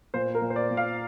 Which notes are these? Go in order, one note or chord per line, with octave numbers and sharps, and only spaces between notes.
A#2 C5
A#4
A#2
C5
D5
A#2
F5